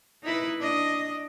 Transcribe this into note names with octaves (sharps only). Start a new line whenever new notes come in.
D#4 E4 B4
D4 D#5